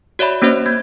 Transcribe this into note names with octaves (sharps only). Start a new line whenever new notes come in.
F#4 C#5 D5 E5 B5
A#3 C#4 F#4 C5 C#5
A#3 G6 G#6